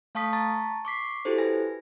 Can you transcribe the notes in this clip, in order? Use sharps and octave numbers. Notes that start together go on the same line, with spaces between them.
A3 F5 A5 C#6 D#6 B6
A5 A#5 C#6 A6
C#6 D6 B6 C7
E4 F#4 G4 A4 C5
B4 G#5 A#6